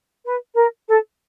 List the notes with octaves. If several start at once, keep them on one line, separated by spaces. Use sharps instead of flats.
B4
A#4
A4